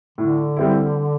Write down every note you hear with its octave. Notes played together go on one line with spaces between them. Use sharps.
A2 D3
G3 C4 E4